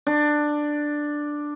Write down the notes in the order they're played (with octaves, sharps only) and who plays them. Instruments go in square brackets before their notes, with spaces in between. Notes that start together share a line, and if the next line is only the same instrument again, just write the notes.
[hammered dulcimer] D4